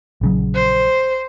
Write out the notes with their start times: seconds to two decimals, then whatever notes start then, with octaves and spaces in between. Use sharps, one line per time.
0.21 A#1 C#3 F#3
0.55 C5